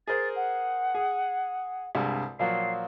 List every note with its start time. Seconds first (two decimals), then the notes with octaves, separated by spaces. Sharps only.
0.07 G#4 A#4 C5 A6
0.36 F#5
0.95 G#4
1.95 C2 G2 G#3
2.39 A#2 F3 F#3 C7